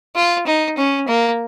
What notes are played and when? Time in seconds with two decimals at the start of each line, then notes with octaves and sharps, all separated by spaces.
0.16 F4
0.47 D#4
0.78 C#4
1.08 A#3